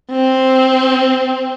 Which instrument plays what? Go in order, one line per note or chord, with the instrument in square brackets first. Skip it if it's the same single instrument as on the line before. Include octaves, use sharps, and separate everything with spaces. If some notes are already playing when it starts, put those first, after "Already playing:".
[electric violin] C4